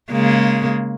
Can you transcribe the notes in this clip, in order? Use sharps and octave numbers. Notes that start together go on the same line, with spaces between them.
C#3 G#3 A#3